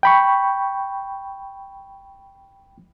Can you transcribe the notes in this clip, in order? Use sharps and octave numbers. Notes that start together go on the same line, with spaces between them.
G5 B5 C#6